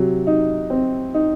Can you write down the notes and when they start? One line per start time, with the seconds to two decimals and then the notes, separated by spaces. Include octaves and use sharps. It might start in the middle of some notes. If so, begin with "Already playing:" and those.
Already playing: C3 F#3
0.27 D#4
0.70 C4
1.14 D#4